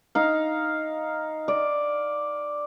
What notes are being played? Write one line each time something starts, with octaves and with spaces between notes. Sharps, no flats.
D#4 F5
D5